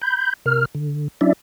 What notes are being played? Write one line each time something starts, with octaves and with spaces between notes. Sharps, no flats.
B5 G6
C3 A#4 F6
D3
F#3 C#4 D4 E4 D5 E5